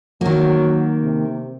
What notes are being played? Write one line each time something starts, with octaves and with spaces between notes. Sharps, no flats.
D#3 F#3 A#3
C3